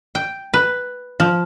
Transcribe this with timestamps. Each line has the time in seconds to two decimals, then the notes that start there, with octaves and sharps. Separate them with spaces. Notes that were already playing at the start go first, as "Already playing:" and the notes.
0.15 G5
0.54 B4
1.20 F3